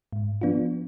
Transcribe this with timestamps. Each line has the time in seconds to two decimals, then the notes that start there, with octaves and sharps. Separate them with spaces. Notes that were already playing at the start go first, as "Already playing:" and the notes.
0.13 G#2
0.41 F3 B3 D4 F4